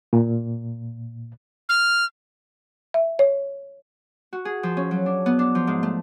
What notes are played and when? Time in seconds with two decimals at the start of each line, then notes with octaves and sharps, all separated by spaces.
0.13 A#2
1.69 F6
2.94 E5
3.19 C#5
4.33 F#4
4.45 G#4
4.63 F3
4.77 C#4
4.91 F#3
5.06 D4
5.26 B3
5.39 D4
5.55 F3
5.67 G#2
5.83 A3